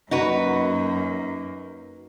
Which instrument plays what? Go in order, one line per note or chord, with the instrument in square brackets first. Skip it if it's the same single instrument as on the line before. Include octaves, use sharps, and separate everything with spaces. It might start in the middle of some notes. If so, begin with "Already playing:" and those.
[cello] F#2 A#3 [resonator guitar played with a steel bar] D#4 F#4 B4